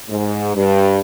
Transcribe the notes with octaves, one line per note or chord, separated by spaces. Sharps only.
G#2
G2